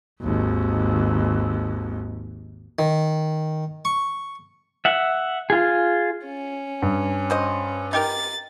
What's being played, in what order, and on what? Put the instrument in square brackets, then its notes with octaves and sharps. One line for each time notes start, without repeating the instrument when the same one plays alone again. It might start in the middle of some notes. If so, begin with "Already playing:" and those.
[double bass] G#1 D#2
[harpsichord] D#3
C#6
[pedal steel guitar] E5 F#5
F4 G#4
[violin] C#4
[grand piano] G2
[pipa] F#4 C5 D#5
[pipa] D#4 G4 A#4 [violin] A6